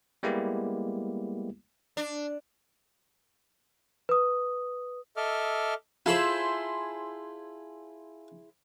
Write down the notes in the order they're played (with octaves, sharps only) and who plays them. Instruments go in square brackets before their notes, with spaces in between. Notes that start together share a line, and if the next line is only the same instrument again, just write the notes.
[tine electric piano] G3 G#3 A#3 B3 E4 G4
[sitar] D4
[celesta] B4 D#6
[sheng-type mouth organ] A4 D#5 E5 D6 F6
[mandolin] E4 G#4 C5 [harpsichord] F4 A4 B5